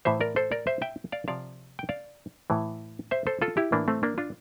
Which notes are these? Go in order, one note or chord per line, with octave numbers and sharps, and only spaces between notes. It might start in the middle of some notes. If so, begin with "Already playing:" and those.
A2 E3 C5 E5
A#4 D5
A4 C5
A#4 D5
C5 E5
E5 G5
D5 F5
C3 F3 D5 F5
G5
D5 F5
A2 E3
C5 E5
A4 C5
F4 A4
E4 G4
A2 E3 A#3 D4
A3 C4
A#3 D4
D4 F4